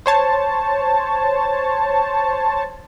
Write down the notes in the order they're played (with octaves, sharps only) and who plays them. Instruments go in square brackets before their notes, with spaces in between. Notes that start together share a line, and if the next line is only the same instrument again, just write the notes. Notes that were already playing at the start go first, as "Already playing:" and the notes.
[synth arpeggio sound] C5 C#5 A5